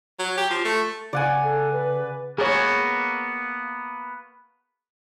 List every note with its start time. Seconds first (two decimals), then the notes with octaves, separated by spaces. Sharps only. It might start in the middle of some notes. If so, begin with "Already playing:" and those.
0.19 F#3
0.37 G4
0.50 F3
0.65 A3
1.13 C#3 D5 F#5 G#5
1.44 A4
1.73 B4
2.38 A#3 B3 F#4 G#4 C#5